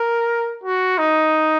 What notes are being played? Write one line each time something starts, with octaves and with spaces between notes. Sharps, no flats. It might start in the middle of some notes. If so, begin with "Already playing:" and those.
Already playing: A#4
F#4
D#4